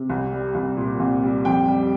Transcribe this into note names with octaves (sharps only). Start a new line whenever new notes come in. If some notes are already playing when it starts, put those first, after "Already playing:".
Already playing: C3
C2
G3
C2
A#2
C2
G3
F2 G5
G3